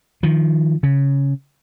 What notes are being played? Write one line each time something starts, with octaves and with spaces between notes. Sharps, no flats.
D#3 F3
C#3